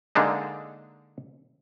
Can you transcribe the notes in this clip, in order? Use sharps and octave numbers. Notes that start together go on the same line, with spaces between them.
D3 G#3 A#3 D4 D#4